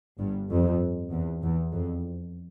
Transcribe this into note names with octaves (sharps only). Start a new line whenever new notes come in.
G1 G2
F2
E2
E2
F2